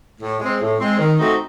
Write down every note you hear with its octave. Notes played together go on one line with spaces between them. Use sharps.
A2
G#3 C4
A2
G#3 C4
D#3
A3 C4 D#4 F#4